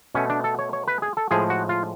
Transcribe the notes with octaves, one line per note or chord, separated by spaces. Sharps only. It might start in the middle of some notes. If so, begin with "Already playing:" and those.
B2 A3 C#4
D4
A4
C#5
C#5
B4
G#4
A4
A2 F3 G#3 G#4
F#4
F4